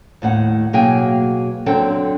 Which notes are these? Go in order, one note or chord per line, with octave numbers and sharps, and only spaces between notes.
D#2 A2 F#5
B2 F#3 A#3 G#4 G5 G#5
D3 F#3 C4 A4 G5